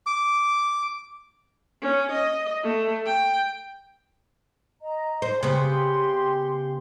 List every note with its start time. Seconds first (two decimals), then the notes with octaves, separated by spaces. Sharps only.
0.06 D6
1.82 C#4
2.11 D#5
2.63 A3
3.06 G5
4.81 D#5 A#5
5.22 C5
5.43 C#3 B3 G4 C6